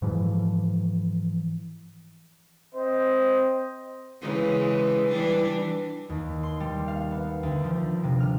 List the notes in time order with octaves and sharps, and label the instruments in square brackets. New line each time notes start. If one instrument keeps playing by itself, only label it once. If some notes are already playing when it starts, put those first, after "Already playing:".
[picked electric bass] G#2 E3 F3
[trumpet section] C4 C5 D#5
[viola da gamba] C#3 E3 G#3
E3 G3 D4
[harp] D#2
C6
G3
F5
B3
D2
F3
C3
F6